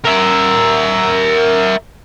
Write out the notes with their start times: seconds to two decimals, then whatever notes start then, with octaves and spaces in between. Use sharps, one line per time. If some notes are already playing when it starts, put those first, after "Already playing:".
0.04 A#4 E5